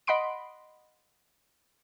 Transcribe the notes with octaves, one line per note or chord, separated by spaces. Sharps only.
D#5 F#5 B5 C6 D7